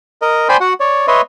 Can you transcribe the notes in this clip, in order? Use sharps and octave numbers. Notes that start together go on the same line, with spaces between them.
A#4 D#5
C5 D5 G5 G#5 B5 C6
F#4 F#5
C#5 D5
B4 C#5 D#5 E5 C6